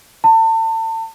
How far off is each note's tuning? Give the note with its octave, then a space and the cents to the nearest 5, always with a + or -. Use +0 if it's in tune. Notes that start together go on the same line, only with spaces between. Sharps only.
A5 +35